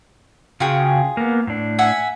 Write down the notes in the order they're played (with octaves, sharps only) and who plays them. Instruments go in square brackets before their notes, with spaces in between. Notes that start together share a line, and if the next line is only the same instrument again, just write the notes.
[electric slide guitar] C#3 F#4 G5 [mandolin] F4 G#4
[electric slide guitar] A#3 B3
A2 D4
[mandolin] E5 F#5 G#5